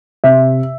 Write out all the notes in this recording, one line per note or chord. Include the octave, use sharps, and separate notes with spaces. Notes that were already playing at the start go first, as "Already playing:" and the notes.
C3 E5